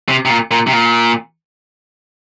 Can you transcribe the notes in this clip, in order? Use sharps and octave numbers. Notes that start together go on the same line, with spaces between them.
C3
C3
A#2
A#2
C3
A#2